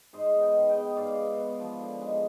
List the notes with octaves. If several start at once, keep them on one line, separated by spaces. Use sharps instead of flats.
G#2 C5 D#5
B3
D#5 G5
G#2
D#5 G5
B3
G#2 D5 F5
B3
B3
F3
D3
G#3